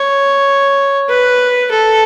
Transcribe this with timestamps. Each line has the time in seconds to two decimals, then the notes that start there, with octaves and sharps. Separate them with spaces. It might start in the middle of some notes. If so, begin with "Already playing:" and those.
Already playing: C#5
1.09 B4
1.71 A4